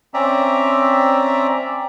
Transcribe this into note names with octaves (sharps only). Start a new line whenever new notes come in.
C4 C#4 D5 E5 A#5